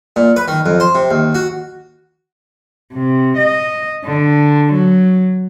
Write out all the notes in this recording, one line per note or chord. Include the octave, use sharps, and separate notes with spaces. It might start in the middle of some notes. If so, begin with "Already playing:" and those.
A#2
B4
D#3
F2
C5
C3
D#2
F#4
C3
D#5
D3
F#3